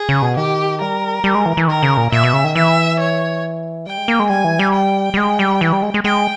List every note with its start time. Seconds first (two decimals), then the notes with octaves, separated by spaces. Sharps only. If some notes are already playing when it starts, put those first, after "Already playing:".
Already playing: G#4
0.09 C#3
0.22 B2
0.37 D#3 G4
0.81 G3 A#4
1.24 G3
1.35 G#3
1.46 E3
1.57 E3
1.68 D#3 A#4
1.83 C#3
1.97 A#2
2.12 A#2 E5
2.23 B2
2.33 C#3
2.44 D#3
2.55 E3 E5
3.00 C#5
3.87 G3 G5
3.98 G#3
4.08 A#3
4.20 G#3
4.30 G3 G#5
4.44 E3
4.59 G3
4.73 G5
5.14 G3
5.17 G#3
5.39 G3
5.61 E3
5.73 G3
5.83 G#3
5.94 G#3
6.04 G#3 G5